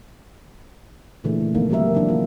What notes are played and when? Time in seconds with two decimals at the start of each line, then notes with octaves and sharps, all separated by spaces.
1.24 A#2 C#3 E3 A3 D4 G#4
1.41 C#3
1.55 D#3 F3 A#3 B3 D#4 A4
1.70 F#3 G#3 C4 G4 A#4 E5
1.94 C#3 E3 D4
2.09 D#3 A#3 D4 F4